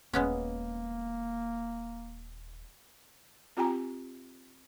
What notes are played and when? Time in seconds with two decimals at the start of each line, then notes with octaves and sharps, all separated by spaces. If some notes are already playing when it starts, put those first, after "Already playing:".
0.13 D#1 G#3 A#3 B3 C#4
3.57 C4 F4 G4 G5 G#5 A#5